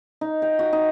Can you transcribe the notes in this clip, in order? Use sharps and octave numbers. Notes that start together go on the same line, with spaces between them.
D#4
G5
F#4
D#4